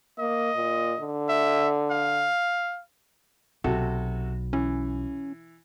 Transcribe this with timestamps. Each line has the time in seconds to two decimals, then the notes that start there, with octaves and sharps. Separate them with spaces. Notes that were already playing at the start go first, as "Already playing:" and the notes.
0.19 A#3 D#5
0.56 A#2
1.00 D3
1.29 E5
1.91 F5
3.64 B1 C3 F#4 A4
4.53 E3 C#4